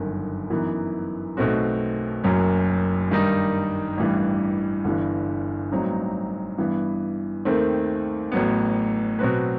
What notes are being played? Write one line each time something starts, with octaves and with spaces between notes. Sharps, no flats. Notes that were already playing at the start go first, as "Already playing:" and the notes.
Already playing: G1 F#2 D#3
F#2 E3 B3 D#4
B1 B2 A3 C4 F#4
F#1 F#2 F#3
G2 D#3 G3 D#4
A1 G2 E3 G3
G1 G2 E3
A1 G2 F#3 C4 D#4
G2 E3 B3
D#2 D#3 A3 C4
A1 A2 F#3 B3
B2 F#3 C4 F#4 B4